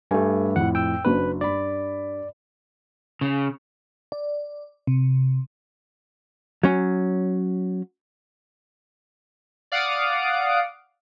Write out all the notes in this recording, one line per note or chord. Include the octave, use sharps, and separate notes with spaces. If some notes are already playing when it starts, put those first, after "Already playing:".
G2 A3 G4 A4 G#5
F2 A2 F#5
G5 E6
F#1 D4 F#4 B4
G2 D5 B5
C#3
D5
C3
F#3 C#4
D5 F5 F#5 D#6 D7